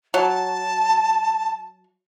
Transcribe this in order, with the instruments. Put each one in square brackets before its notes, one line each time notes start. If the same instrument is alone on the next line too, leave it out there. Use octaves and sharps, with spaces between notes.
[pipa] F#3 [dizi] A5